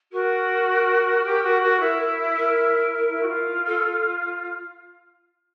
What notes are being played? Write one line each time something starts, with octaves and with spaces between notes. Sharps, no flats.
F#4 A#4
G4
F#4
F#4
E4
A#4
E4
F#4
F4
A4